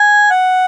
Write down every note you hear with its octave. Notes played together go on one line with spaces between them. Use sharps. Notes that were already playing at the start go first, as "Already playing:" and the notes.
Already playing: G#5
F#5